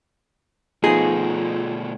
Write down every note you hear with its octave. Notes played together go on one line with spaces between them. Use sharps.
B2 F3 A3 B3 D#4 F4 G#4